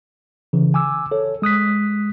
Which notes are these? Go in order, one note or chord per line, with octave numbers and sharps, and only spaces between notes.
C#3 E3
G#5 D6 E6
A4 C#5
G#3 D#6 F#6 B6